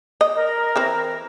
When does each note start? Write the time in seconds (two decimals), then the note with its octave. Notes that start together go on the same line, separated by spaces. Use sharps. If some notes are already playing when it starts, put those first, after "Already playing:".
0.21 D#5
0.35 A#4
0.76 E3 C4 E4